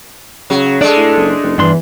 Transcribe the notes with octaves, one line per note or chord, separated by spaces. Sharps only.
C#3 F#3
G#3 A3 D4 A4 D5
A2
F#1
F#1
E2 G2 E3 D4 C6